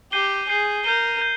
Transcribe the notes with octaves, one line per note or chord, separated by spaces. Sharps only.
G4 G6 C7 D#7 G7
G#4 G6 C7 D#7 G7
A#4 G6 C7 D#7 G7
G6